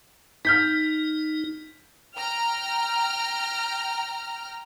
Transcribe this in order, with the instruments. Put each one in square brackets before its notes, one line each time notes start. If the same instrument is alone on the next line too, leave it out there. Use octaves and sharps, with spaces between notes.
[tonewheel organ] D#4 [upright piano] F6 G6 B6
[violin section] G5 A#5 F6